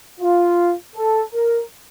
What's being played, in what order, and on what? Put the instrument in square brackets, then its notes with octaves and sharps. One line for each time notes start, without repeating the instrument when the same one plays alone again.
[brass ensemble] F4
A4
A#4